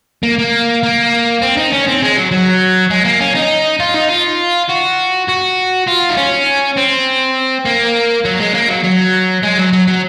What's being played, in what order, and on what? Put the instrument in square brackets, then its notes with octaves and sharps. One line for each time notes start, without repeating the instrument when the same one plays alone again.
[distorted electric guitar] A#3
A#3
A#3
C4
D#4
C#4
C4
G#3
F#3
F#3
G#3
A#3
C#4
D#4
F4
D#4
F4
F#4
F#4
F4
D#4
C#4
C4
A#3
F#3
G#3
A#3
F#3
F#3
G#3
F#3
F#3
F#3